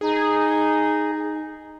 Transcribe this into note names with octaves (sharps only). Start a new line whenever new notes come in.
D#4 G#4